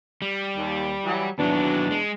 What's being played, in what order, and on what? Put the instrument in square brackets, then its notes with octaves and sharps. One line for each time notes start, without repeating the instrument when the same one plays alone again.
[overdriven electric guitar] G3
[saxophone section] D#2
E3 F#3
[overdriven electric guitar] D#2 F#3 [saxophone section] B2 E3 D4
[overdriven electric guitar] G#3